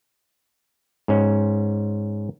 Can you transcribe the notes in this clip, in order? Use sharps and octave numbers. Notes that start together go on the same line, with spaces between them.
G#2 C#4